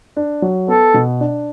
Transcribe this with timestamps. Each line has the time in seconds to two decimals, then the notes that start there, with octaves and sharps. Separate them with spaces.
0.17 D4
0.42 F#3
0.68 B3 A4
0.94 B2
1.20 D4